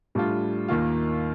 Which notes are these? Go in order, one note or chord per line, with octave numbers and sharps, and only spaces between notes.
A2 G3 D4 F4
D#2 D#3 A#3 F4